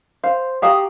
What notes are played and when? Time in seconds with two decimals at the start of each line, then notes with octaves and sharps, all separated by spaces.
0.24 C5 F5
0.62 F#4 G4 F5 A#5 D#6